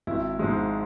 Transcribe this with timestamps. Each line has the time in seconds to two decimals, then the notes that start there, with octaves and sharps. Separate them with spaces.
0.07 G#1 E4
0.39 G#2 F3 G#3